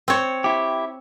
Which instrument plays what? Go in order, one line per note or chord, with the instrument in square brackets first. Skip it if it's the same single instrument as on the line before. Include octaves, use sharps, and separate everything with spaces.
[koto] C4 C#5
[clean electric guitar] E4 G4